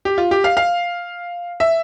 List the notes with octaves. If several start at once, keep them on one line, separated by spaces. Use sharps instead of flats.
G4
F4
G4
F5
F5
E5